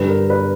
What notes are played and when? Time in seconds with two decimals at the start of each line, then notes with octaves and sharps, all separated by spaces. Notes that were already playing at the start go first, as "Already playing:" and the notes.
Already playing: G2 D3 G3 B4
0.09 A#4
0.30 B4